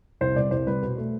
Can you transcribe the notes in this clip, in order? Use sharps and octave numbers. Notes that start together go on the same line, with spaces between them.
C2 C5
C3 G3 B3 D5
C2 C5
C3 G3 B4
B2
A3